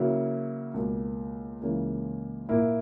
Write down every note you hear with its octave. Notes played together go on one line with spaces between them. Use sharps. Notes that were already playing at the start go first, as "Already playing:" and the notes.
Already playing: C#3 F#3 A#3 E4
C#2 B2 A#3
C#2 C#3 E3 A#3
A#2 A#3 E4